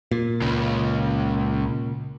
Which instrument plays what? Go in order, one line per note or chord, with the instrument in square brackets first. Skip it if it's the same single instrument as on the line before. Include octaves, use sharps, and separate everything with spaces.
[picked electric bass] A#2
[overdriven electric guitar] C#2 C#3